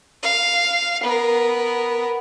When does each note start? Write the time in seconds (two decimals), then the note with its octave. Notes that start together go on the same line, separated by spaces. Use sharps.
0.23 F5
1.03 B3 A#4